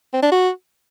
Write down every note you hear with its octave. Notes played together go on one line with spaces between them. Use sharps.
C4
D4
F#4